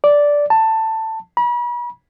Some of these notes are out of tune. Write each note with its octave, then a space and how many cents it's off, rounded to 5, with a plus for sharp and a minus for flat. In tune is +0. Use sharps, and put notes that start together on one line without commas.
D5 -10
A5 +15
B5 -40